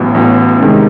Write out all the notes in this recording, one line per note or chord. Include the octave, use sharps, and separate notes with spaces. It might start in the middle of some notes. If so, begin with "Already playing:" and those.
Already playing: A1 A2 F#3 B3
A1 A2 F#3 B3
C3 D#3 G#3 C#4